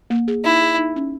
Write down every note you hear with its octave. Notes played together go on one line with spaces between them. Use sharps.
A#3
G#4
D#4 E4
G#4
D#4
C#4